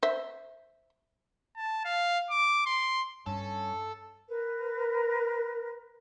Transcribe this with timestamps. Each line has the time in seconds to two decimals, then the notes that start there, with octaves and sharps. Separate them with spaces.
0.03 C5 E5
1.56 A5
1.85 F5
2.31 D6
2.66 C6
3.26 G2 C#4 A4
4.28 A#4 B4